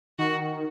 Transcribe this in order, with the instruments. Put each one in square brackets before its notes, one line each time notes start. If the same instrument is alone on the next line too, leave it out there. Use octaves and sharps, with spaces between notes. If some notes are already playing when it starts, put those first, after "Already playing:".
[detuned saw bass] D#3 [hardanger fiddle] F#4